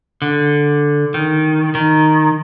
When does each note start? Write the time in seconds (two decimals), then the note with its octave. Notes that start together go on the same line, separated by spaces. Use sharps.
0.22 D3
1.14 D#3
1.75 D#3